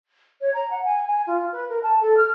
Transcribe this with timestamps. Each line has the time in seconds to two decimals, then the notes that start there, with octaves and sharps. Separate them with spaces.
0.41 C#5
0.54 A#5
0.70 F#5
0.84 G#5
1.07 G#5
1.26 F4
1.52 B4
1.69 A#4
1.83 A5
2.01 A4
2.17 F6